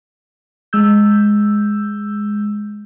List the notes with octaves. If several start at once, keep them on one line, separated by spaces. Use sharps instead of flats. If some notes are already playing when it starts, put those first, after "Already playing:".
G#3 E6 G6